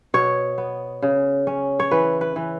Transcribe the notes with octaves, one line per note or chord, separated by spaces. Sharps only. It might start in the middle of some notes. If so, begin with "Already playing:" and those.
B2 C#5
B3
C#3
C#4
C#5
E3 B4
B4
E3